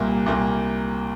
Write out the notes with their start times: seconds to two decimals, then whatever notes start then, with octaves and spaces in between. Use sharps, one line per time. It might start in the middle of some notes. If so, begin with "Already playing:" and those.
Already playing: C2 A#2 A#3
0.26 C2 A#2 A#3